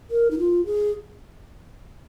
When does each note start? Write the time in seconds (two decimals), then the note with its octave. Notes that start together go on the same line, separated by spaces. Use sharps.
0.11 A#4
0.31 D#4
0.39 F4
0.66 G#4